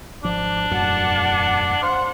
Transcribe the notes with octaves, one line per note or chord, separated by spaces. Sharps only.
G#1 F3 D4
E1 F#2 A2 F#5 A5
C5 F#5